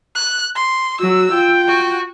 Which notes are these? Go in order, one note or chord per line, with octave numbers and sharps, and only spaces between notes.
F#6
C6
F#3 F#4 E6
F4 G5
F#4